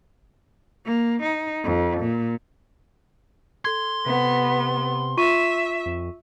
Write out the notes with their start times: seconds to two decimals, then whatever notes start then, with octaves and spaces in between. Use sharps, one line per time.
0.85 A#3
1.23 D#4
1.64 F2
2.01 A#2
3.65 A4 C6 G#6
4.06 C3 B3
5.17 F4 E5 C#6 D#7
5.86 F2